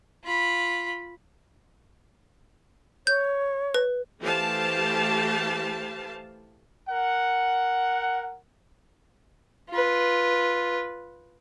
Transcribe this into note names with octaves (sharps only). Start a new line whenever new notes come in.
F4 B5
C#5 G6
B4
E3 A3 G4 C5 F5 A5
A#4 F#5
F4 B4